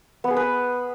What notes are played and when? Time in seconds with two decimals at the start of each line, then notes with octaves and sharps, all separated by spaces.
0.24 B3
0.30 G#4
0.37 B4